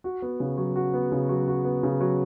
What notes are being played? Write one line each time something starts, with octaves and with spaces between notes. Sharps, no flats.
F#4
B3
C#3
F#3
F#4
B3
C#3
F#3
F#4
B3
C#3
F#3